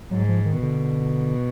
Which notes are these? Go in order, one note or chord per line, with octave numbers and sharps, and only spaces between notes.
G#2 F#3
F3
D#3
B2 D3